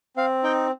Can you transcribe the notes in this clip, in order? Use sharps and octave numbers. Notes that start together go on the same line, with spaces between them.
C4 F5
D#4 G5